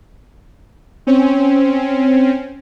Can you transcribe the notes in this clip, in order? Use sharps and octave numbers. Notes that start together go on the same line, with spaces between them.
C4 C#4